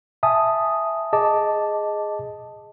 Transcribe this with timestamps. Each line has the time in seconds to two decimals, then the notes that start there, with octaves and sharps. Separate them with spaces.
0.23 E5 G#5 A5 D#6
1.13 G#4 D#5 A5 D6